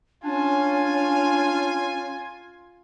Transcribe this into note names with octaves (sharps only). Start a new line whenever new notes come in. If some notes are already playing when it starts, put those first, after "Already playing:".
C#4 D4 F4 G#5